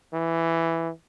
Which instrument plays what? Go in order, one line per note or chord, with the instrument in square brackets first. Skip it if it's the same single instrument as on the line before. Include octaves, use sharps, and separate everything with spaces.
[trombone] E3